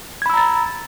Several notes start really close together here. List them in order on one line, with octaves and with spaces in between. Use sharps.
G#6 B5 E6 A#5 A6